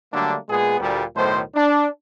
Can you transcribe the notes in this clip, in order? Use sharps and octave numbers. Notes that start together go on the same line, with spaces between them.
D3 F#3 G3 A3 A#3 D4
A#2 G#3 B3 G#4
D2 A#2 G3
B1 A2 D#3 A3 C5
D4